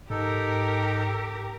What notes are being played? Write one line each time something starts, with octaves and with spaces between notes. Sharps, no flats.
G#2 D#4 G4 A4 A#4